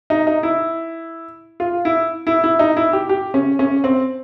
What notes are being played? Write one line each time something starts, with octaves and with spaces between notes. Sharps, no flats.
D#4
D#4
E4
F4
E4
E4
E4
D#4
E4
G4
G4
C#4
C#4
C4